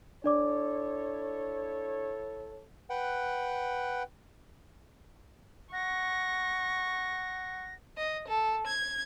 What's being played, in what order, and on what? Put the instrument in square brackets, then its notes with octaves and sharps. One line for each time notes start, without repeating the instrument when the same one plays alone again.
[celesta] D4 D5 D6 [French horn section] E4 A4 C#5
[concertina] B4 F#5 G5
[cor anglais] F#5 [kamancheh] C#6 [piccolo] A#6
[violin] D#5
A4
G#6